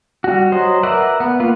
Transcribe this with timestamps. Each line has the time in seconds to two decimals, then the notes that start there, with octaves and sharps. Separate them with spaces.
0.24 G3 F#4
0.52 F#3 C5 D#5
0.83 A#4 B4 D5 E5 F#5
1.20 B3
1.40 A#3 F4 B4